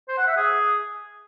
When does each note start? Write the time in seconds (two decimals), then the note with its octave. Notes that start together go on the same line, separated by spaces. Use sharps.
0.09 C5
0.18 F#5
0.27 E5
0.37 G#4